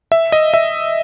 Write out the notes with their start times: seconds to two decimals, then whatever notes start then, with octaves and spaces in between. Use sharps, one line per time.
0.12 E5
0.32 D#5
0.54 E5